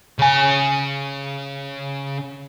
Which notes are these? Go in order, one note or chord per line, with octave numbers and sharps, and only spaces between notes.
C#3 G#5